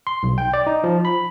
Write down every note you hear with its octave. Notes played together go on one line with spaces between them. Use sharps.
C6
B1
G5
D5
D#4
F3
B5